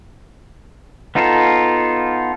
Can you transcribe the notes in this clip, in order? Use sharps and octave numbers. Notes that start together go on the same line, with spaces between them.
B3 D#4 F4 A4